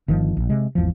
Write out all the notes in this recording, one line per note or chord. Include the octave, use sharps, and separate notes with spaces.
G1 D#3 F3
A#1
C3 G#3
G#1 E2 F3